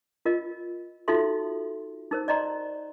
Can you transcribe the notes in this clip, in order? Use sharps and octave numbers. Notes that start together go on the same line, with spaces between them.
F4 A#4 D#5
D#4 F4 F#4 A4 E5 C6
D#4 A#4 C5
D5 D#5 A#5 C6